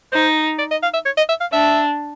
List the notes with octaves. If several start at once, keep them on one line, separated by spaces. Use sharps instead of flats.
D#4 C5
D5
D#5
F5
E5
C#5
D#5
E5
F5
D4 E5